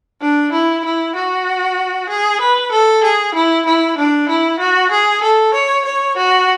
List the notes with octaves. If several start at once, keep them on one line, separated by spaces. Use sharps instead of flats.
D4
E4
E4
F#4
G#4
B4
A4
G#4
E4
E4
D4
E4
F#4
G#4
A4
C#5
C#5
F#4